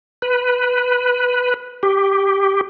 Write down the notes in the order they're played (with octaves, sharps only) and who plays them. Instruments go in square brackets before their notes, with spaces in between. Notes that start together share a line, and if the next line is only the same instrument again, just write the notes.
[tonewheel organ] B4
G4